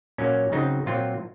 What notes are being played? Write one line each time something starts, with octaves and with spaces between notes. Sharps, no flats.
A#2 F#3 A#3 C#4
C#3 F#3 C4 D#4
A#2 F#3 C4 F4